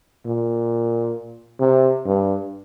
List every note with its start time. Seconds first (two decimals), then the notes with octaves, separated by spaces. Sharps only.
0.26 A#2
1.60 C3
2.05 G2